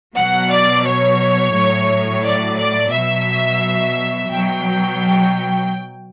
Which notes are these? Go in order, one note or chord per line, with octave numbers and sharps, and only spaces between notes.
B2 F#3 F#5
D5
C#5
A2 F#3
D5
D5
B2 F#3 E5
B2 F#3 G5